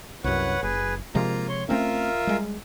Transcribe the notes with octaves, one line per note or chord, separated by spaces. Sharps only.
C2 F#2 B4 C#5 F#5
F#1 G#4 B4
C3 F3 G#3 A#3 F4 A#5
C#5 C6
A3 C4 C#4 F4 A#4 E5
G3 G#3